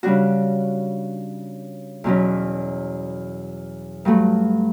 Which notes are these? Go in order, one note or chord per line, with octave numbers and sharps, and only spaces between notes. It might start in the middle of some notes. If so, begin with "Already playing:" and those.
C#3 G3 D4 F#4
E2 B2 F#3 C#4
G2 F#3 A3